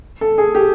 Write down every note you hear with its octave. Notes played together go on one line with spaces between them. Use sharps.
A4
G#4
G4